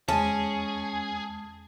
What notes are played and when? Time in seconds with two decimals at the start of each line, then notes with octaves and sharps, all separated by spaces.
0.08 E2 G#3 C#4 G#4 A5